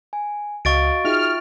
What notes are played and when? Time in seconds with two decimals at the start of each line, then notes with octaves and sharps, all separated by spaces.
0.13 G#5
0.65 C#2 F#4 D#5 F5 C#6 A6 D7
1.05 D#4 F4 F#4 G#4 E5 G5 F6